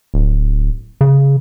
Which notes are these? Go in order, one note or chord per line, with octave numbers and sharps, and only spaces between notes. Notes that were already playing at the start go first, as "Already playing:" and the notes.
D1
C#3